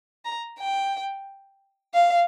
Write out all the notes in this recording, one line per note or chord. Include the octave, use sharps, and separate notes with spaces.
A#5
G5
F5